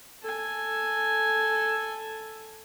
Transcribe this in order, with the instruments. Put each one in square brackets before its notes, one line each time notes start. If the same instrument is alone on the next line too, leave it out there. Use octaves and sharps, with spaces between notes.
[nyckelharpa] A4 G#5